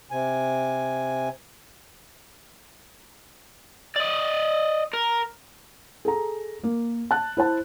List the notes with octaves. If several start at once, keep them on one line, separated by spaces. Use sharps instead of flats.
C3 G#5
D5 D#5
A#4
G#4 A4 A#5
A#3
A5 F#6
E4 C5 A5